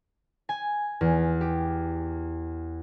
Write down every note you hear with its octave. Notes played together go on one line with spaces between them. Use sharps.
G#5
E2
G4